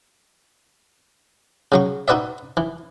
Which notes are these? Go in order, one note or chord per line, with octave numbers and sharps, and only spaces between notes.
C#3 F#3 C#6
D#4 F#4 B4 D5 E5
E3